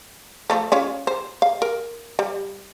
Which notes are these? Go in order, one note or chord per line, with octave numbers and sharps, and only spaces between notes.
F3 A3 A4
C#4 F4 C#5
C5
F5
A#4
G3